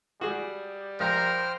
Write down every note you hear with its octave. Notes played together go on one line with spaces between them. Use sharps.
G3 F#4 G#4
A#1 A#4 C5 G5 F6